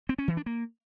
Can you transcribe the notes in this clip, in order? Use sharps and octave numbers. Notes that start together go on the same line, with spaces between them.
C4
C#4
E3
D4
A#3